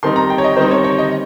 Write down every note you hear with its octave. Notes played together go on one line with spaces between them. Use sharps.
D#3 G3 C4 D#4 C6
A#5
G5
C#5
D#5
D#3 G3 C4 D#4 C5
C#5
C#5
D#5